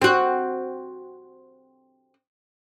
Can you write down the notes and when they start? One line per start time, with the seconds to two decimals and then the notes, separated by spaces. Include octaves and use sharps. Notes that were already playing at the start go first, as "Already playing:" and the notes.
0.02 C4 F#4